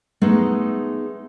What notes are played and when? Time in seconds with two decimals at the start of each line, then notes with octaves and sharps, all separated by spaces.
0.21 G#3 A3 B3 D#4 G#4